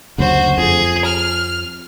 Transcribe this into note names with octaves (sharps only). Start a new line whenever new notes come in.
F#1 D2 F#4 C5
F2 G#4
F6